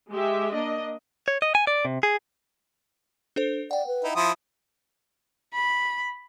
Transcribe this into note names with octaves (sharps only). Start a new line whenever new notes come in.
G#3 G4 E5
A#3 D4 D#5
C#5
D#5
G#5
D5
C3
G#4
D4 A4 C5
D5 F#5 G5
B4
D#4 E4
F3 E4 C6 D#6
B5